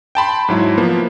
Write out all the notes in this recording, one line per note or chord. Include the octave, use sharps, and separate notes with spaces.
G5 A5 B5 C6
G#2 F#3 E4
F3 A#3 B3